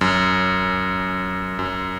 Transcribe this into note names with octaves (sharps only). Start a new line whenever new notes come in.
F#2
F#2